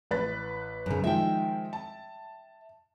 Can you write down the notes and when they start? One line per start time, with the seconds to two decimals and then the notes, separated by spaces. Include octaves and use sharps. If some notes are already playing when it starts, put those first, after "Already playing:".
0.11 A1 B4 A6
0.86 F#2 C#3
1.04 D#3 F3 G#3 E5 G5
1.73 A5